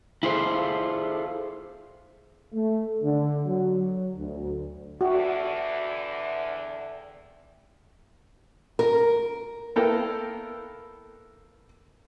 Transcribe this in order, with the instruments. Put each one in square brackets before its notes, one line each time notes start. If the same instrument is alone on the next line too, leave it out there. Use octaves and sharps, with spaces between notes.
[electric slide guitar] E4 F4 G#4 A4 C5
[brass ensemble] A3
D3
F#3
D2
[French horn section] E2 D3 [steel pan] F#4 [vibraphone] E5 G5
[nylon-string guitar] A#4
[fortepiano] A#3 B3 E4 A4 A#4 G5